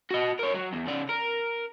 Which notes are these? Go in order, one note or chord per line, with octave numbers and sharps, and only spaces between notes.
F#4 D#5
A#4 C#5
F#3
E2
C#3 D5
A#4